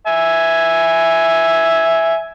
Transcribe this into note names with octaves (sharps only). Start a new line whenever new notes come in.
E5 G#5